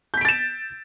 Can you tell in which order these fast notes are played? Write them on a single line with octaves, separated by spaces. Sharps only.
G6 B6 D7 A6 E7